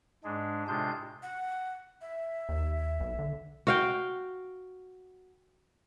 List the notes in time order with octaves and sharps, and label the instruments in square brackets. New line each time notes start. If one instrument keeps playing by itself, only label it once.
[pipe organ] G#2 G#3 D4
A2 C3 G#3 D4 F4 G6
[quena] F#5
E5
[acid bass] D#2
B1
D3
[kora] F#4 F5 G5